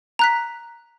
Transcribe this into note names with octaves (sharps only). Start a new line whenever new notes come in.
A#5 F#6 B6